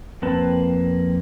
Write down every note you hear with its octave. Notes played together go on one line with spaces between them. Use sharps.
F2 A#3 C4 B4 A5